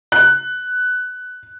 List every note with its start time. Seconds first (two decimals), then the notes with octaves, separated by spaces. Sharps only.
0.12 F#6